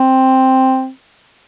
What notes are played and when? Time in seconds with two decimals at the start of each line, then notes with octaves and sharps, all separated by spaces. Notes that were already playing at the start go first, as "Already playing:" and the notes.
Already playing: C4